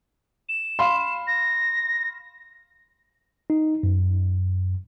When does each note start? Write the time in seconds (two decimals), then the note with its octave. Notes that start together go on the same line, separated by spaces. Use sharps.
0.49 E7
0.79 F5 B5 C6
1.27 A#6
3.50 D#4
3.83 F#2